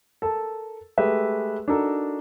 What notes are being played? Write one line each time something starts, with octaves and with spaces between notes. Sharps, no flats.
A4 A#4 A5
G#3 A3 G4 G#4 B4 E5
D4 D#4 F#4 A4 A#4